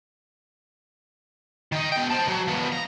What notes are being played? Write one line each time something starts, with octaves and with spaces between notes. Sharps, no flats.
D#3 D#4
B2 G5
C5 A5
F#3
F3 B3
A#5